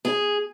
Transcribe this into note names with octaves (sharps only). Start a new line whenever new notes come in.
G#4